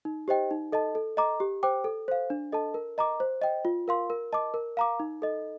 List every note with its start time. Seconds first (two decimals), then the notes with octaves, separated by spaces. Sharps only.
0.05 D#4
0.28 G4 C5 D#5 G5
0.51 D#4
0.72 A4 D#5 A5
0.95 A4
1.17 D#5 A#5 D6
1.40 G4
1.63 C5 G5 D6
1.84 A4
2.08 C5 F5
2.30 D4
2.52 A4 D#5 A5
2.74 A#4
2.98 D#5 A#5 D6
3.20 C5
3.42 D#5 G5
3.65 F4
3.88 A#4 F5 C6
4.10 A#4
4.33 D#5 A5 D6
4.54 A#4
4.77 F5 A#5 D6
5.00 D#4
5.22 A4 D#5